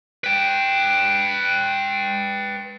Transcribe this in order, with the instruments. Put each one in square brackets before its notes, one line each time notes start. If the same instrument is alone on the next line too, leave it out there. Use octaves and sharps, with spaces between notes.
[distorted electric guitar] B4 G5